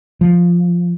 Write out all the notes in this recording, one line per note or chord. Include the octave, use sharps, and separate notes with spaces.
F3